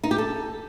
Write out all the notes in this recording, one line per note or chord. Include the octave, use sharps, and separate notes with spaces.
D#4
G4
A4